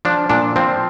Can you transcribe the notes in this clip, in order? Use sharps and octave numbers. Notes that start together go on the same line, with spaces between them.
F3 D4
A#2 D4
F3 C4